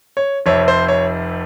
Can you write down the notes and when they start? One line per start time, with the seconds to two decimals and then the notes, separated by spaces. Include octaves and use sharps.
0.17 C#5
0.46 F1 F2 C3 C#5
0.68 C5
0.88 C#5